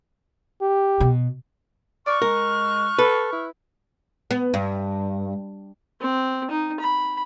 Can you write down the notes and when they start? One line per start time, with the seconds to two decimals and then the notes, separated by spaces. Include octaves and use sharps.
0.61 G4
1.00 B2
2.07 D5 C#6 F6 F#6
2.22 G#3 A#4
2.99 A4 B4
3.32 E4
4.31 B3
4.54 G2
6.01 C4
6.50 D#4
6.80 B5